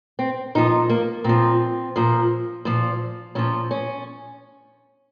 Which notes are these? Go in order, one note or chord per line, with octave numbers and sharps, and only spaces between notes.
C4
A#2 F3 D#4
A#3
A#2 F3 C4
A#2 F3
A#2 F3
A#2 F3 C#4
C#4